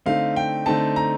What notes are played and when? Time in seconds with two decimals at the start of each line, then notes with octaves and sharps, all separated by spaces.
0.06 D3 A3 C4 D#4 F5
0.36 G5
0.66 D3 A3 C4 D#4 A5
0.96 A#5